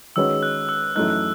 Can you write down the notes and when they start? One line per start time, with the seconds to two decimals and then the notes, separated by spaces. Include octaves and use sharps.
0.16 D#3 G#3 C#4 F#4 B4 E6
0.43 F#6
0.69 E6
0.95 F#2 E3 A3 D#4 F#6
1.10 F#6